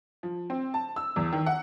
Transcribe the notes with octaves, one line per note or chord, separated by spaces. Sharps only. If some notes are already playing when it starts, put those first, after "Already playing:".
F3
C4
A5
E6
E2
D#3
F#5